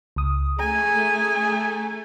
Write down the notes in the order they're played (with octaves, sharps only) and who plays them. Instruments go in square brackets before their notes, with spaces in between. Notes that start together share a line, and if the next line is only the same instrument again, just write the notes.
[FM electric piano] C#2 D#6
[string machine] A3 [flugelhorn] G#4 [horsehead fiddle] G#5 [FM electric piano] A#5